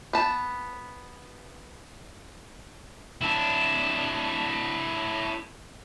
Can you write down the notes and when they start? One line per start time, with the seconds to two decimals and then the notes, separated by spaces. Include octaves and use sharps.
0.13 B3 A5
3.21 D4 E4